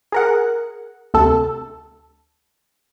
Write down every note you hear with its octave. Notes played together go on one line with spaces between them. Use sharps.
G#4 A#4 F#5
D2 C3 A4